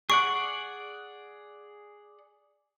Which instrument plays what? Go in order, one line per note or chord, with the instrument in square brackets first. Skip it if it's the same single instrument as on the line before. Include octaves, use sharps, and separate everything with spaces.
[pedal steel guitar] G#4 D5 F#5 [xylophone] C#6